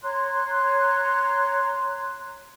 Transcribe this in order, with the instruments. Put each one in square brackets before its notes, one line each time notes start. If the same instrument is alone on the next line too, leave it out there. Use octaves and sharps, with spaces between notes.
[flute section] C#5 A#5 C6 F#6